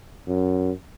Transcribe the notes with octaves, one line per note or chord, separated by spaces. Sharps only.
F#2